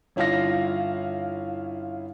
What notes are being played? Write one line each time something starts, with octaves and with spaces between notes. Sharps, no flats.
G1 C#4 E4 F4 F5 A#6